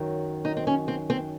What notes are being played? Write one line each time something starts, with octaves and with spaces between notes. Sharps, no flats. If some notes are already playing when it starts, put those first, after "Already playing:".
Already playing: F#2 D#3 F#3
D#4
C4
C#4
C4
C4